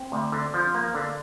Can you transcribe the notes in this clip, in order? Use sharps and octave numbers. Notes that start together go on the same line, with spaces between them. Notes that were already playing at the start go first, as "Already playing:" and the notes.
Already playing: C4
D2
D3
F3
A#3
D3